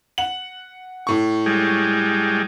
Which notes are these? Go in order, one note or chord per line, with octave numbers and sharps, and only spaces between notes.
F#5 F#7
A2 C#6
G3 G#3